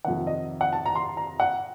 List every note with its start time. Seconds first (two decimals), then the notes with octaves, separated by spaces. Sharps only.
0.05 F2 C3 D#3 F#5
0.27 D#5
0.61 F#5
0.73 A5
0.86 A#5
0.95 C6
1.17 A#5
1.40 F#5